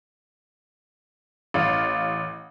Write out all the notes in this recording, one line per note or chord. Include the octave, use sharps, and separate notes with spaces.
A1 F5